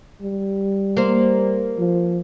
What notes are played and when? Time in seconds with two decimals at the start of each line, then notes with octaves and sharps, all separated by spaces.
0.22 G3
0.97 A#3 C5
1.78 F3